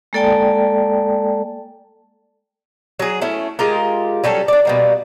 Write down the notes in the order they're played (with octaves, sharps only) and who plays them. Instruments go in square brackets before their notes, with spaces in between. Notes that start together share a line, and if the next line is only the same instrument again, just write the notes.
[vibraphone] G#3 A#3 A4 D5 G5 A5
[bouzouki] F#3 G#4
A3 C#4 E4
G#3 F4 G4 A#4
F#3 G3 C#4 A4
D4 D5
B2 G3 A#3